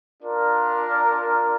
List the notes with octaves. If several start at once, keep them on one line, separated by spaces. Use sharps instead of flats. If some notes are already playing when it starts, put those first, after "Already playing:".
D4 F4 A#4